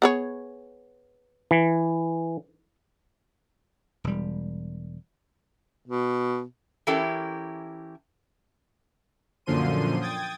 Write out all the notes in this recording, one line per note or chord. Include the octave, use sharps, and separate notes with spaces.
B3 G#4 C#5
E3
E1 G3
B2
E3 C#4 E4 G4 A4 A#4
F#2 A#2 D3 F3 C6 D#7
G5 D#6 G#6 A6